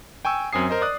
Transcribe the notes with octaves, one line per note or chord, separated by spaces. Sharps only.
G5 G#5 C#6 E6
F#2 C4 G#5 D#6 C7
A#4 C5 D#5
D5 D#6 F#6